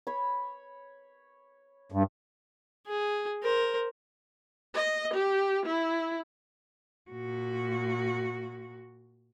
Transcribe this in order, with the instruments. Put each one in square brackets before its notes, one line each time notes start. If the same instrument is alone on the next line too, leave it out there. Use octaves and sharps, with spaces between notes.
[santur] C#5 B5
[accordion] G2
[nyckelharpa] G#4
A#4 C5
[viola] D#5
G4
E4
[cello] A#2 F#4